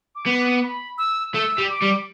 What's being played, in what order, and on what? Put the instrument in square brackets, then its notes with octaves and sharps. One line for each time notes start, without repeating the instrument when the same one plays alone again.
[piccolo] D6
[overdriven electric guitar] B3
[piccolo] D6
B5
E6
[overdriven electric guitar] A3 [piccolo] E6
[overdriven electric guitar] G3
[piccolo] D6
[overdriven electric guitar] G3